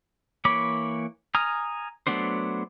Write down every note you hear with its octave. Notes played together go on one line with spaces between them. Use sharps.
E3 A#3 C#5 B5 D6
G#5 A#5 D#6 F6
F#3 A3 B3 D4 C5